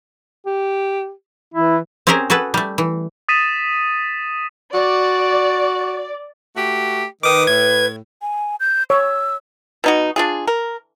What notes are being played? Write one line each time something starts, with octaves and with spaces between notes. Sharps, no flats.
G4
E3 E4
C4 C#4 G4 G#4 A#4 C5
F#4 G#4 A4 B4
G3 A3
E3
D#6 A6 B6 D#7 E7
F#4 D5
A3 F#4 G4
D#3 B4 D6 D#6
A2 G#6
G#5
G6
C#5 E6
B2 D#4 F#4
D4 F4 G#4
A#4